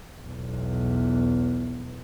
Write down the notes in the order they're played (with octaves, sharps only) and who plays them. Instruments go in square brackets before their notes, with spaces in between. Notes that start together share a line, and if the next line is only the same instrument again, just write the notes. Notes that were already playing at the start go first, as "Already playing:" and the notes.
[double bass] B1 E2